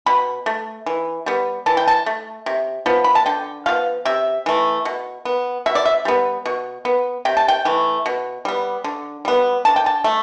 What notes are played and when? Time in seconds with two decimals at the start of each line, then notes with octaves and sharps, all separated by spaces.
0.06 B2 B5
0.46 A3
0.86 E3
1.26 G3 B3
1.66 E3 A5
1.77 G5
1.88 A5
2.06 A3
2.46 C3
2.86 F3 B3
3.04 B5
3.15 A5
3.26 D3 G5
3.66 F3 B3 F5
4.05 C3 E5
4.46 E3 A3
4.85 B2
5.25 B3
5.66 B2 E5
5.75 D5
5.85 E5
6.05 G3 B3
6.46 B2
6.85 B3
7.25 C3 G5
7.37 A5
7.48 G5
7.65 E3 A3
8.06 B2
8.45 G3 B3
8.84 D3
9.25 G3 B3
9.65 D3 A5
9.76 G5
9.86 A5
10.04 A3